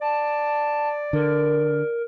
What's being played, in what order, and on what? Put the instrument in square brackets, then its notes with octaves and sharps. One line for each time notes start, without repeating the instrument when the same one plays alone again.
[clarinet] D5 [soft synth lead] A5
[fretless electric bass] D3 [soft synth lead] A#4